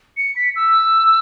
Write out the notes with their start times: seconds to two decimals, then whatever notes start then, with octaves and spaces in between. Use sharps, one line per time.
0.17 C#7
0.36 B6
0.56 E6